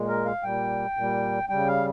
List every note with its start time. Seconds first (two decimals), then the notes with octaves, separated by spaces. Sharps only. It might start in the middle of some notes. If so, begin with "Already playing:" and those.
Already playing: A#2 G#3
0.08 A#4
0.26 F5
0.43 A#2 G3 G5
0.97 A#2 G3
1.49 C#3 G3 G5
1.67 F5